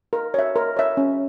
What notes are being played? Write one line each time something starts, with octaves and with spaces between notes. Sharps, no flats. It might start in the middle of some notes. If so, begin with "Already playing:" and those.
A#4
C#5 E5
A#4
C#5 E5
C#4